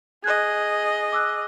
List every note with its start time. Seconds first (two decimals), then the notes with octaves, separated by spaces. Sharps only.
0.24 G#4 D#5 F#6 G#6
1.12 D6 E6 F#6